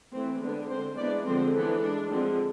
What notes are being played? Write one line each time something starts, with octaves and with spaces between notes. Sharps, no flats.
E3 A3 C4
D3 G#3 B3 D4
D3 G#3 C4 C5
E3 G#3 B3 D4 D5
D3 F3 G#3 C4 C5
E3 B3 D4 A4
G#3 D4
D3 F3 G#3 C4